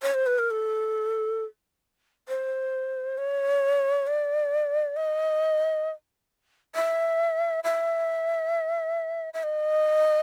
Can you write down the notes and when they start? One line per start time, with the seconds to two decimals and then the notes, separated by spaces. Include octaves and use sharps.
0.03 C#5
0.14 C5
0.27 B4
0.39 A#4
0.51 A4
2.29 C5
3.18 C#5
4.07 D5
4.96 D#5
6.75 E5
7.64 E5
9.34 E5
9.43 D#5